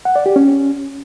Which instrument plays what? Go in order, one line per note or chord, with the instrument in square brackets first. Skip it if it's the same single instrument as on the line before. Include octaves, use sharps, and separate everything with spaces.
[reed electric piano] F#5
D5
G4
C#4